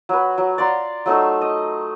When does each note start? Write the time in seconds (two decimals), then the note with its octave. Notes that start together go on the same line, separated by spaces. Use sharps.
0.09 F#3 B4
0.38 F#3
0.58 D5 F5 A#5 C6
1.06 F#3 A3 D#4 E6
1.41 D#5